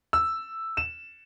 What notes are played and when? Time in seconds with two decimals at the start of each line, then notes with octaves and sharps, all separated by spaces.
0.13 E6
0.77 E7